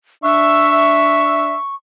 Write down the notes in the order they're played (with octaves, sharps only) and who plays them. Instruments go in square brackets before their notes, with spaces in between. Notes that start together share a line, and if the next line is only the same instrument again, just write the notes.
[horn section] D4 E5 [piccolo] C#6